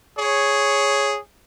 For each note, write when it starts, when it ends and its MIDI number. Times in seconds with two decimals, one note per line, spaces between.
0.17 1.18 68
0.17 1.18 73